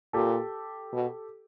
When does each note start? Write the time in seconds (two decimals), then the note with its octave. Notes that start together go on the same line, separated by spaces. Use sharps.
0.13 A#2 G4 A4
0.93 B2